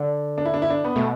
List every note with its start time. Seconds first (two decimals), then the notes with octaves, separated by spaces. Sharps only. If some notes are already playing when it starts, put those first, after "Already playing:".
Already playing: D3
0.38 D4
0.45 E4
0.54 D4
0.62 E4
0.70 D4
0.84 B3
0.96 B2 A3